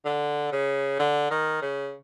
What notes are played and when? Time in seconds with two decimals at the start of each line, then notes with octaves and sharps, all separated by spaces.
0.05 D3
0.52 C#3
0.99 D3
1.31 D#3
1.62 C#3